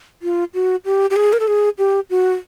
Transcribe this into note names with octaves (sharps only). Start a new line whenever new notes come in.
F4
F#4
G4
G4
G#4
A#4
A4
G#4
G4
F#4